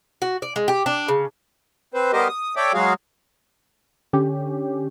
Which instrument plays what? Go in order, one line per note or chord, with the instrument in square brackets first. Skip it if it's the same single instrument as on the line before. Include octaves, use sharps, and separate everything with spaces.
[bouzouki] F#4
D5
G#3
G4
D4
C#3
[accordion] C4 B4 C5
G3 B3 G4 A#4 C5 D#5
D#6
A4 C#5 D5 E5 G5 D6
F#3 G#3 F#4 G#4 F5
[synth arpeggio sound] D3 C#4 G4